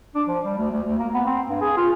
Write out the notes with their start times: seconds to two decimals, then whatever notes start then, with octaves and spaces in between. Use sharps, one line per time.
0.15 D4
0.28 F3
0.45 G3
0.58 D2
0.71 D2
0.84 D2
0.99 A#3
1.14 B3
1.26 C4
1.49 G2
1.61 G#4
1.77 F4